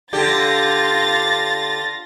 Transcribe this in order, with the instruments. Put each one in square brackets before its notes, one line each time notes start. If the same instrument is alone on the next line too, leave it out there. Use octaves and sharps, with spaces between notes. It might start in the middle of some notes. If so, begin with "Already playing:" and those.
[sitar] D3 G4 [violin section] F4 A6 A#6